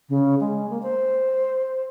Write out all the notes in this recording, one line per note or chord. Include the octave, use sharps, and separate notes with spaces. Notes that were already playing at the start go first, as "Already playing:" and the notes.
C#3
G#3
A#3
C5